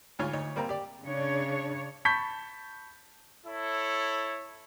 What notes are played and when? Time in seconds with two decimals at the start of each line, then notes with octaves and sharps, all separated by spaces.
0.19 D2 G#2 F4 C#5 F5 F6
0.33 D2 D#4 C#5
0.56 G3 A#3 C4 A#5
0.69 G4 D5
1.04 C#3 D4 C#5
2.05 A5 B5 C#6 G6 B6
3.46 E4 A4 C#5